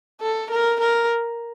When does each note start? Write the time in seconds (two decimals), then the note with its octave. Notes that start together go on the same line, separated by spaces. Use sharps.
0.22 A4
0.51 A#4
0.81 A#4